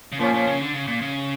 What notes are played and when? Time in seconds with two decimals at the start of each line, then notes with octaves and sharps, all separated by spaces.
0.12 C#3
0.20 A#2 F3 A#3 C#4
0.34 A#2
0.47 C#3
0.60 D3
0.74 C#3
0.87 A#2
1.01 C#3